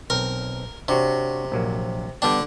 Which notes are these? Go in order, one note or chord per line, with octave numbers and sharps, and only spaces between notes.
B1 C4 A#4
C3 D4 F#4 C#5
A#1 F#3 A#3
D3 G3 B3 D4 G5